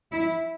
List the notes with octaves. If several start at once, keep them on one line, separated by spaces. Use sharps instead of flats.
E4